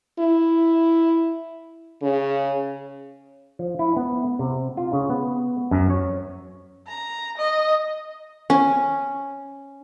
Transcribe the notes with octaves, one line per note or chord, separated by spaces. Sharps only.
E4
C#3
F3
E4
B3
C3
F4
C#3
B3
F#2
C#5
A#5
D#5
C#4